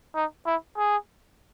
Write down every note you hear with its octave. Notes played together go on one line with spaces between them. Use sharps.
D#4
E4
G#4